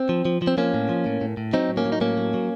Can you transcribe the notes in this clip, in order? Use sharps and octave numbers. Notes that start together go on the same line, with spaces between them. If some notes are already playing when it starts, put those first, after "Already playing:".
Already playing: C4
F3
F3
F3
C4
F3 A#3 C#4
A2
F3
A2
A2
A2
F#3 C4 D#4
A2
A#3 C#4
F#3
D#4
A2 A#3 C#4
F#3
F#3